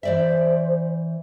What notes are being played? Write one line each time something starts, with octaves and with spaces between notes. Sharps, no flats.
E3 C5 D5 E5